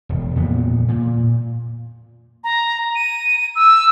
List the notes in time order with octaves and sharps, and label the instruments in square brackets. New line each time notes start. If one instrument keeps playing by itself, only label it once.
[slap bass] E1
F2 A#2 B3
A#2
[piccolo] A#5
D#7
E6